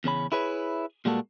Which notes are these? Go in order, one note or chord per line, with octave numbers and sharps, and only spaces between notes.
E2 C#3 C#4 B5
E4 G#4 B4 C#5 E5
A#2 G3 G#3 A#3 F#4 A4